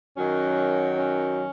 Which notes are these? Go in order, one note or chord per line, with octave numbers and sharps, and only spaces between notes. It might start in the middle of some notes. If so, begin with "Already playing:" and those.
F#2 D#3 F#3 C#4
C#4